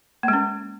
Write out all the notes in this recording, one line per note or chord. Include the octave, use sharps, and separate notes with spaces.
G#3 A#3 C#4